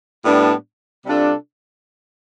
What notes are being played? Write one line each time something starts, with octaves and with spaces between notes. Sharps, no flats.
A2 G3 B3 D4
C3 G3 D4 F4 A4